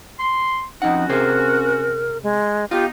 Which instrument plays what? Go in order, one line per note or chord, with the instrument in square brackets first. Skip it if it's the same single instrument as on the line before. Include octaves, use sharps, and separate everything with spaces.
[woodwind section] C6
[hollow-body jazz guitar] F2 F#5 [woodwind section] C#4 F#4 [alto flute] D#4
[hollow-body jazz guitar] C3 G#4 C5 [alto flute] A#4
[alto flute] G#3
[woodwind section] B3 D#4 [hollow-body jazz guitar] F4 [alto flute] G4